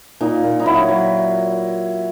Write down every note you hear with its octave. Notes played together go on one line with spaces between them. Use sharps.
A#2 D#4
A#2
D#4
F#3 E4
F#3